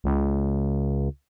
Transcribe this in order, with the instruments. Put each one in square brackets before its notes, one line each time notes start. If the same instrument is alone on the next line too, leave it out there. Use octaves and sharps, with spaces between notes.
[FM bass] C#2